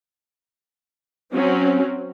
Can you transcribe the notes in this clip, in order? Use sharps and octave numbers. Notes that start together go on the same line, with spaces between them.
F#3 C4 C#4